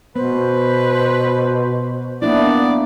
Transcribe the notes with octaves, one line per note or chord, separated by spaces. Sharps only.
B2 B3 B4 C5
A#3 B3 D4 E4 D5